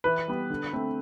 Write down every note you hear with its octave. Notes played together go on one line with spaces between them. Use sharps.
E3 B4
G3 B3
D3
A3 C4